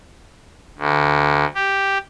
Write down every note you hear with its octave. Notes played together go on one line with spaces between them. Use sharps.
D2
G4